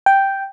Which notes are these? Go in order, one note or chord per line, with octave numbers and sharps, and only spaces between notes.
G5